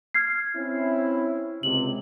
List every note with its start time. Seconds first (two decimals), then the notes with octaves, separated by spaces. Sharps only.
0.14 F6 G#6 C7
0.56 C4 C#4 E4
1.63 C#2 C3 F#7